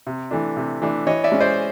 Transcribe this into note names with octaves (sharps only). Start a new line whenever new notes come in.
C3
E3 A3 D4
C3
E3 A3 D4
E3 C#5 D#5
D5 E5
G#3 C#4
C5 D5